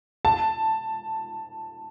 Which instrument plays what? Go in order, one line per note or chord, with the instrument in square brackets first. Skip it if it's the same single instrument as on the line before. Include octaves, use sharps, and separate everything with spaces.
[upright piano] A5